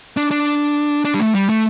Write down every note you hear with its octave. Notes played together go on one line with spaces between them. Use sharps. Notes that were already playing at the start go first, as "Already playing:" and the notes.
D4
D4
D4
G3
A3
G3
A3